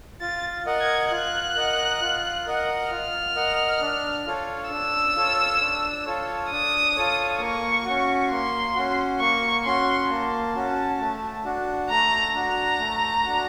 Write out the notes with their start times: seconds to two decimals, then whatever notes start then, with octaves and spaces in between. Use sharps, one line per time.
0.21 F4 A6
0.66 A#4 D#5 F#5
0.81 G#6
1.11 F4 F#6
1.56 A#4 D#5 F#5
2.01 F4
2.46 A#4 D#5 F#5
2.91 F4 F6
3.36 A#4 D#5 F#5
3.80 D4
4.26 F4 A4 C#5
4.70 D4 E6
5.15 F4 A4 C#5
5.61 D4
6.06 F4 A4 C#5
6.51 D4 D#6
6.96 F4 A4 C#5
7.40 A#3 C#6
7.85 C#4 F#4
8.30 A#3 C6
8.74 C#4 F#4
9.19 A#3 C#6
9.65 C#4 F#4 C6
10.10 A#3 A5
10.55 C#4 F#4
10.99 A3
11.45 D4 F#4
11.90 A3 A#5
12.34 D4 F#4 A#5
12.80 A3
13.24 D4 F#4